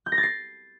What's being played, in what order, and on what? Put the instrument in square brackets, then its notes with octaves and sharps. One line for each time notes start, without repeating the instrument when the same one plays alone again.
[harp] G6
A#6
A6
C7